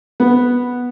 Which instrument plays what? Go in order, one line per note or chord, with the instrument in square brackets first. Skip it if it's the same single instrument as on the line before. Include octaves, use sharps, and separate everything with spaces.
[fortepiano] B3